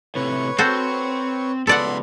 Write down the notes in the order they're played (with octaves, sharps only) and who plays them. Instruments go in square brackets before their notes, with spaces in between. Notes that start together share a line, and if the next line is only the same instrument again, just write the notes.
[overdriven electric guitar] A2 C3 [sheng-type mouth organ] B4 C#5 C#6
[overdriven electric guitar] C4 G5 [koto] F#4 A4 C5
[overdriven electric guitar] C#2 B3 [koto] A4 D5 F#5 [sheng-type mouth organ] B5 C6